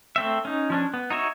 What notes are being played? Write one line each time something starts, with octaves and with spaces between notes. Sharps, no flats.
A3 C4 E5
C#4 D#4
F3 C#4 D4
B3
D#4 F#4 C#5 E5